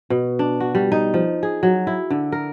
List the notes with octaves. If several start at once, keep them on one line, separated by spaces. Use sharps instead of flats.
B2
D4
F#4
G3
D#4
F3
G#4
F#3
E4
D3
A#4